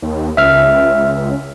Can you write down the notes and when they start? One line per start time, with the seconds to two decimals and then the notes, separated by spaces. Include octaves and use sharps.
0.02 D#2
0.37 C#2 E5 F6